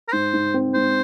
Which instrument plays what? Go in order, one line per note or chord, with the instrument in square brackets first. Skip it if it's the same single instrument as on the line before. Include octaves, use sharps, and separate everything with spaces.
[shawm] A#4
[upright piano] G#2 [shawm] C5
[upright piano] G#2
C4
[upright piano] G#2 [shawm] C5